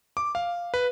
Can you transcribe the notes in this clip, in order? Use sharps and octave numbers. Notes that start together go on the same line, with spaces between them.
D6
F5
B4